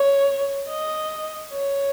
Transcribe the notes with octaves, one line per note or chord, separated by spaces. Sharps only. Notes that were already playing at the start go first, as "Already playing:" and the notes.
Already playing: C#5
D#5
C#5